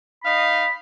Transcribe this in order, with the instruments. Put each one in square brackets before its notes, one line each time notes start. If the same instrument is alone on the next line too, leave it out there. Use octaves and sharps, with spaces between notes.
[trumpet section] D#4 D#5 F5 [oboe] B5